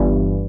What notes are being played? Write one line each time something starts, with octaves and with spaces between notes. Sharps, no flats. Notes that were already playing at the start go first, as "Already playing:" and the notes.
Already playing: G1 G2 E3